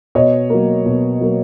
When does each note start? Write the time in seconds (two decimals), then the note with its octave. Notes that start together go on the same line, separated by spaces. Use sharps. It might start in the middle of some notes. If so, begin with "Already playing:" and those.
0.15 B2 C#5 D#5
0.50 F#3 A#3
0.86 B2
1.20 F#3 A#3